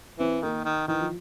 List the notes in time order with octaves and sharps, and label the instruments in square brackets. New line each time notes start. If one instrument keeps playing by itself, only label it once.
[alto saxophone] E3 [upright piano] C4
[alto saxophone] D#3 [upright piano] A#3
[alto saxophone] D#3
[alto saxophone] D#3 [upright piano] E3
[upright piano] F3